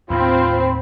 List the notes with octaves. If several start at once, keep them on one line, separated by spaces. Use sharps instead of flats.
D#2 A2 C4 F4 B5